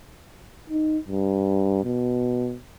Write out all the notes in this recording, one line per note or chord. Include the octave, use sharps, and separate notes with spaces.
D#4
G2
B2